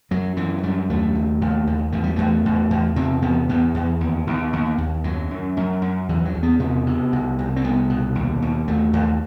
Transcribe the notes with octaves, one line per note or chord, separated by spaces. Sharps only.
F#2 F#3
F#2 E3
F#2 G3
D#2 A3
D#2
D#2
D#2
E2 A3
G3
E2 A3
E2
E2
C3 C4
E2 B3
E2 B3
E2
D#2
D#2
D#2
D#2
F#2 F#3
F#2
F#2
F#2
E2 E3
F#3
E2
B3
C3 B3
C3
C2
C2
C4
C2 B3
B2
D#2
D#2
D#2 A3
D#2